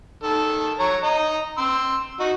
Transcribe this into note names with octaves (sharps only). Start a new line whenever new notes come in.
D#3 A4
C#5 A#5
D#5 A#5
C6 E6
D#4 F#4